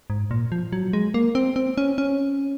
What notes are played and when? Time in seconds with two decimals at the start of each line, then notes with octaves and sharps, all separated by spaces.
0.10 G#2
0.31 A#2
0.52 F3
0.73 F#3
0.93 G#3
1.14 A#3
1.35 C4
1.56 C4
1.78 C#4
1.98 C#4